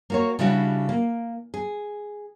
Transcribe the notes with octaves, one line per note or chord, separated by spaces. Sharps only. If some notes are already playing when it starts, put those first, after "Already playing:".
A#3 F#4 C#5
C#3 G3 D4 E4 F#4
A#3
G#4